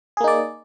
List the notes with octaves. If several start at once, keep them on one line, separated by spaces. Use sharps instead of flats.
A#3 D#4 G#4 D5